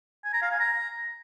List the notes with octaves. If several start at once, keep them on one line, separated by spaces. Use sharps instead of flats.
G#5
A#5
F5
G#5
A#5